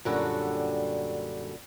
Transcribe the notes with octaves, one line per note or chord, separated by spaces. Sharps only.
F#2 A#2 D3 G3 F#4 A4